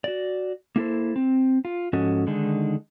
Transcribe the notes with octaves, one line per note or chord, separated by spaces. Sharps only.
F#4 D5
A#3 E4 A4 C5
C4
F4
G#2 F3 C#4 F#4 A4 D#5
D3 D#3 G#3 D4 D#4